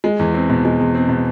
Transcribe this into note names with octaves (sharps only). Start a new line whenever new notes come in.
G#3
E2
C4
B2
G#3
E2
C4
B2